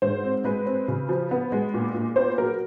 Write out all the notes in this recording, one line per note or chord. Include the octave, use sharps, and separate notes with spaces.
G#2 C5
C4
G#3 B4
C4
C#3
F3
B3
G#3
A#2
A#2
B3 C5
F#3 A#4